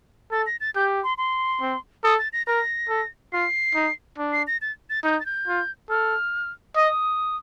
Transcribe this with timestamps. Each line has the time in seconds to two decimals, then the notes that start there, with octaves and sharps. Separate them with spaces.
0.31 A4 A6
0.46 A#6
0.60 A6
0.75 G4 G6
1.04 C6
1.18 C6
1.61 C4
2.04 A4 D#6
2.18 A6
2.33 A#6
2.47 A#4 A#6
2.89 A4
3.32 F4 C7
3.75 D#4
4.18 D4
4.32 C7
4.47 A#6
4.61 A6
4.90 A6
5.04 D#4 G6
5.20 A6
5.26 G6
5.48 F4
5.89 A4 F6
6.76 D#5 D#6